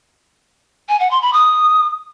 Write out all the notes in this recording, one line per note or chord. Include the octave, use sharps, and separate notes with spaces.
G#5
F#5
C6
B5
D#6